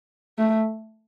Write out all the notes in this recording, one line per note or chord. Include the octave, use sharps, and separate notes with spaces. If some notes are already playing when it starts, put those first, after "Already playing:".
A3